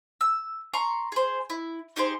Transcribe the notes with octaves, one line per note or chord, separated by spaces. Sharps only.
E6
A#5 C6 C#6
G#4 C5
E4
D#4 G4 G#4 C5